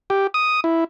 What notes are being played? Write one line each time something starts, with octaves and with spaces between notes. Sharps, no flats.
G4
D#6
E4